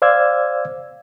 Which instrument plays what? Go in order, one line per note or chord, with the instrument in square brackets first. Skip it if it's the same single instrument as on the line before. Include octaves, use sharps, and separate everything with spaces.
[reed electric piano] C5 D5 F5 E6 G#6